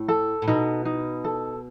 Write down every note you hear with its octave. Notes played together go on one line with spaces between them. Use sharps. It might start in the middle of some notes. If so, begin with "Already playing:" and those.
Already playing: A2
A4
A2
B2 D#4
D#4
A4